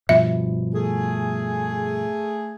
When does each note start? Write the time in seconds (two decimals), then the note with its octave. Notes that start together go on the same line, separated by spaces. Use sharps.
0.09 G2 B2 F3 E5
0.74 A3 G#4